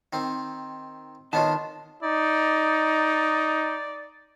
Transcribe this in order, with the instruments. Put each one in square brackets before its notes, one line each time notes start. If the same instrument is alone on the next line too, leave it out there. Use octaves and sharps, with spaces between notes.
[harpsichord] D#3 C4
[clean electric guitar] D#3 A5 [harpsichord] B3 C#4 F4 [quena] D#5
[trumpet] D#4 [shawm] D5